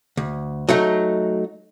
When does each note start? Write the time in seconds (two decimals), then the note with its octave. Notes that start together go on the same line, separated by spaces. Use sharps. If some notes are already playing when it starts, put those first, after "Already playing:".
0.17 D2
0.69 F#3 A3 D#4